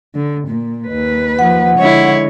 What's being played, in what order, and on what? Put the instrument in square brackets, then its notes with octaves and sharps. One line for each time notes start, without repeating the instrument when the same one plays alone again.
[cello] D3
A#2
D#2 B4
[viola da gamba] F3 [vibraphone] F#5
[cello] D3 G#3 [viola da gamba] E4 C#5